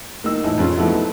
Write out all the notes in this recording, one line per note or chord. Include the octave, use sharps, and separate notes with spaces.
A#3 D#4 E6
A2 E3 D#4
F2 G#3 C#4 F4
F3 F#3 A3 B3 D#4 E4